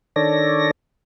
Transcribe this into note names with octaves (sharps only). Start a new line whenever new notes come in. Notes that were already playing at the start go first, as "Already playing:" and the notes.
D#3 D4 A4 C#5 D5 A#6